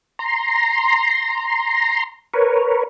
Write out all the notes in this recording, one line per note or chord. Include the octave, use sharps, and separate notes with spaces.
A#5 C6
A#4 B4 C#5